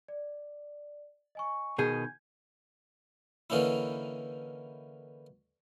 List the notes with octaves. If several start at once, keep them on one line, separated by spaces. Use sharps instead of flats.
D5
D#5 G#5 C#6
B2 D#3 G#4 G6 G#6
D3 E3 A#3 C#4 D#4 E4